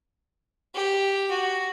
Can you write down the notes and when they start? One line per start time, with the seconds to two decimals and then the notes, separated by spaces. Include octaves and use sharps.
0.74 G4
1.30 F#4